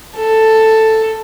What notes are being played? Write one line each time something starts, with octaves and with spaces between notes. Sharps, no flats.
A4